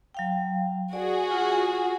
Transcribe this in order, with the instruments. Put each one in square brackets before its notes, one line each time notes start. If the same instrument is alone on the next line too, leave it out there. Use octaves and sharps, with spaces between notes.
[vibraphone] F#3 F5 G5
[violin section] F#4 G#4 [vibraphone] D5
[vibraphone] F4